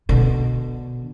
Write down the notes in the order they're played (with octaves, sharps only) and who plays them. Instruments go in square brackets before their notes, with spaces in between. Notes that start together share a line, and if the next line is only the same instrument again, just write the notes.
[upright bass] B2 D3